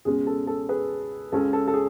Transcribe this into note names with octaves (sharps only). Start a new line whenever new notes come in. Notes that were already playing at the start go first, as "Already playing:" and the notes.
C#2 B2 G#3 C#4 G#4
A4
A4
G#4 B4
C#2 C#3 G#3 C#4 A4
A4
A4
G#4